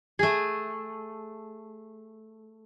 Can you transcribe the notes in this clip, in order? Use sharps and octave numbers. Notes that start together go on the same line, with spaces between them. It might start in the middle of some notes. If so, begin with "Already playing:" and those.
A3 G#4